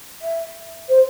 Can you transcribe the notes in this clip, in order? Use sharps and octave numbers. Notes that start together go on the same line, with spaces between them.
E5
C5